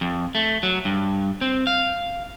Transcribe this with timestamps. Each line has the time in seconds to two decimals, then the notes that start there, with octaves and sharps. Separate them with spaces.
0.01 F2
0.35 A3
0.63 F#3
0.85 G2
1.41 C4
1.67 F5